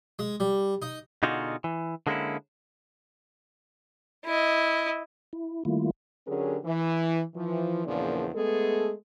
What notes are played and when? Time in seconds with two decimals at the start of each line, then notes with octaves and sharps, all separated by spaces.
0.19 G#3
0.40 G3
0.82 D#4
1.23 B2 D3 D#4 F4 F#4 G#4
1.64 E3
2.07 D3 G#3 A#3 B3 C#4 E4
4.25 E4 D#5
5.33 E4
5.65 D#3 G3 A3 A#3 E4 F4
6.27 D3 F#3 C#4 G4 G#4 A#4
6.65 E3
7.34 E3 F3
7.85 E2 A#2 C#3 F3 A#3 D4
8.34 G#3 A3 B3 G#4 A4